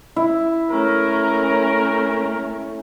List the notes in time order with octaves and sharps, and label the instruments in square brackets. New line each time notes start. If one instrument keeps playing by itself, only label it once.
[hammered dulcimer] E4
[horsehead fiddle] A3 C#4 [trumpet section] A#4